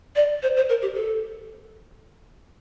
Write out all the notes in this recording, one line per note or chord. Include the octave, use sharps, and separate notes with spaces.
D5
C5
C5
A#4
G4
A4